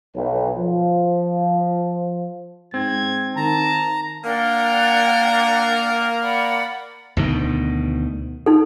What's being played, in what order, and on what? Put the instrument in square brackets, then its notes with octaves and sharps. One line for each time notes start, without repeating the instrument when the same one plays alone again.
[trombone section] B1
F3
[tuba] G#2 [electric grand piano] C4 [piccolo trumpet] G#6
[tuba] D#3 [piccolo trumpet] A5 [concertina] A#5
[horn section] A#3 A#4 [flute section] D4 F#5 G5
[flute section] D5 F#5 B5
[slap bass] D2 B2 D#3
[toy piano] D#4 A4